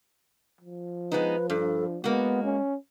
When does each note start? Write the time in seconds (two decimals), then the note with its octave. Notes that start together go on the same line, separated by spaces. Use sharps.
0.61 F3
1.12 G#3 B3 D#4 B4
1.50 G2 A4
2.04 G#3 A#3 B3 F#4
2.44 C#4